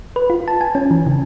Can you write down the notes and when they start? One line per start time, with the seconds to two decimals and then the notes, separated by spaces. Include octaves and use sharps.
0.16 B4
0.30 F4
0.48 A5
0.61 G#5
0.75 C#4
0.91 E3
1.07 C#3